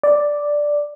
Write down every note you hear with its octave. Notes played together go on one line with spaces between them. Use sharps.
D5